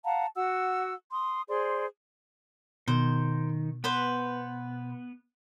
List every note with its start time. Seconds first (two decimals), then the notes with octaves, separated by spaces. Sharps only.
0.05 F5 F#5 A5 A#5
0.35 F#4 F#5 E6
1.12 C6 D#6
1.49 G#4 C5 D5 C6
2.88 B2 D#3 C5
3.84 B3 B4 C5 B5